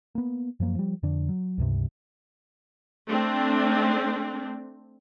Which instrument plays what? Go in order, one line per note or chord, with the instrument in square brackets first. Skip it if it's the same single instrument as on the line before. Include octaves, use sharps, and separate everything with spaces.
[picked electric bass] A#3 B3
F#2 F3 A#3
F3 G3
F2 D3 D4
F#3
C#2 G2 C3
[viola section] A3 C4 D4